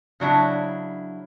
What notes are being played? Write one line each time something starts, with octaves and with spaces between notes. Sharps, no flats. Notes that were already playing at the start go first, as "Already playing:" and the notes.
C#3 F#3 D4 E4